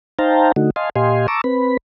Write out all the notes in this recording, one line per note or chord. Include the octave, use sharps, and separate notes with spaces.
D#4 C5 F5 G5 A5 A#5
D3 A3 D#4 F#4
D#5 F5 G#5 A5 C6
A#2 G4 D#5 F5 G#5 C6
A5 A#5 C#6 D6 E6
C4 B4 B5